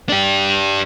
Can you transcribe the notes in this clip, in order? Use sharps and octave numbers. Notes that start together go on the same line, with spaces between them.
D4 G4